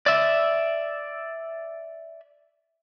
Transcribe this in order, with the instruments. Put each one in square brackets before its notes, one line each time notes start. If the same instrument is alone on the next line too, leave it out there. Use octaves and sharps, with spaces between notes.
[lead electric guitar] D5 E5